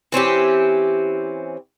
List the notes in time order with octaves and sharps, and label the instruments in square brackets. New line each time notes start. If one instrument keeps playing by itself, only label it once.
[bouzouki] E3 C4 C#4 G4